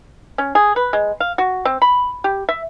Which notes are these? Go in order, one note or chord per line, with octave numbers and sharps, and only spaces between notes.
C#4
G#4
B4
G#3
F5
F#4
C4
B5
G4
E5